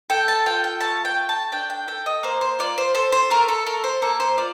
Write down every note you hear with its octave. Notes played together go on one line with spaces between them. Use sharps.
A4 G5
A5
F4 G5
G5
A3 A5
G5
A3
A5
D4 G5
G5
A4 G5
D#5
A#3 C5
C5
F4 D5
C5
A4 C5
C5
A3 A#4
A4
A4 A#4
C5
A#3 A4
C5
F4 D5